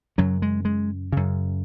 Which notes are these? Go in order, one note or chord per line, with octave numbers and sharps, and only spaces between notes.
F#2 C#3 F#3
G#3
G#3
F#2 C#3